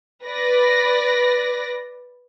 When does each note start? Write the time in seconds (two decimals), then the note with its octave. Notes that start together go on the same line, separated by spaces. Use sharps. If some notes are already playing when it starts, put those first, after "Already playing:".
0.24 B4 D5 A#6